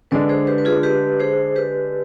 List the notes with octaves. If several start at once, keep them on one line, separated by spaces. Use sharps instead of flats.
D3 G#3 D4 B4 D5
G#4 C5
G4 B4
B4
F4 G#4
G4 B4
G#4 C5
G4 B4